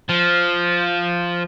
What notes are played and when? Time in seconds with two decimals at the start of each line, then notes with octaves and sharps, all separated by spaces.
0.09 F3